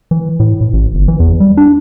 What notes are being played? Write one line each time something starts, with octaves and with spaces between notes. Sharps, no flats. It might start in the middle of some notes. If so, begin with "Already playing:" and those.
E3
A2
A2
A1
G1
E3
E2
G3
D4